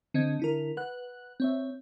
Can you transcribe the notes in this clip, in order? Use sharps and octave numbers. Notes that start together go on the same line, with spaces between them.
D3 C4 D#5 G#6
D3 E4 A#4
B4 F#5 F#6
C4 C#5 E5